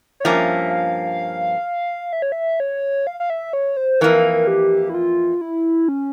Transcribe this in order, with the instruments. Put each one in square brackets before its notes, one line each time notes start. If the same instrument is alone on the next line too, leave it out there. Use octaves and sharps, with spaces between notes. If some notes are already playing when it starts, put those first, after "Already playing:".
[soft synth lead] C#5
[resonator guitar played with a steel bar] G2 F3 A#3 C#4 [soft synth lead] E5
[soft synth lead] F5
E5
C#5
E5
C#5
F5
F5
E5
C#5
C5
[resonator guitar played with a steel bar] F2 E3 A#3 [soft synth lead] A#4
[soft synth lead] G4
E4
F4
E4
C#4